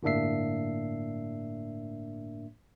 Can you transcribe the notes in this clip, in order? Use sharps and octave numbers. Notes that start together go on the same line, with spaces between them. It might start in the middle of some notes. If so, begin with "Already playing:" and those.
G1 A2 A#3 D4 E5 C7